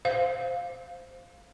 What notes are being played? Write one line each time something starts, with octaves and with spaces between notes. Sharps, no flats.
C5 F5